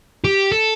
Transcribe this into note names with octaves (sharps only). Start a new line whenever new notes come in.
G4
A4